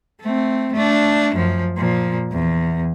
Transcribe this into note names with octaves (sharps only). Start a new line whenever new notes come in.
A3 C4
A3 D4
F#2 F3
A#2 F3
E2